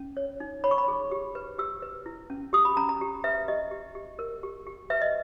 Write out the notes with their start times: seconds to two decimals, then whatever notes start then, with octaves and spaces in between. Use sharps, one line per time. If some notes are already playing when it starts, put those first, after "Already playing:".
Already playing: C#4
0.17 C#5
0.40 D#4
0.64 C#5 B5
0.71 C#6
0.78 B5
0.88 G#4
1.11 G4
1.35 B4
1.58 G4 E6
1.82 B4
2.06 E4
2.30 C#4
2.53 G4 D#6
2.65 B5
2.77 C#4 A#5
2.89 A#5
3.01 G4
3.24 B4 E5
3.48 G4 D#5
3.71 G4
3.95 G4
4.19 A#4
4.43 G4
4.67 G4
4.90 B4 E5
5.02 D#5